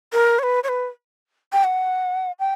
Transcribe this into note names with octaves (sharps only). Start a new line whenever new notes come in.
A#4
C#5
B4
C#5
B4
G5
F#5
G5